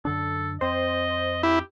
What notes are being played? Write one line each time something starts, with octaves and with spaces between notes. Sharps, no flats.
F#2 D3 D4 A4
F2 C4 C5 D#5
E4 G4